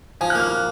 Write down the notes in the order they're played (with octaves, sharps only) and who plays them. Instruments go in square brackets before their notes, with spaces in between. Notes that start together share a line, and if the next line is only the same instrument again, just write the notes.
[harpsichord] F3 [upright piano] G#5
[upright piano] F#6
[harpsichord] A#3 [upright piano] F6